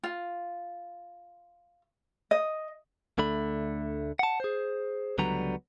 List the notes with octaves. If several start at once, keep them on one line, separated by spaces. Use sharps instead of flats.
F4
D#5
D2 D3 A3 B5
F#5 A5
G#4 C5
C#2 D3 F#3 G3 B3 A#5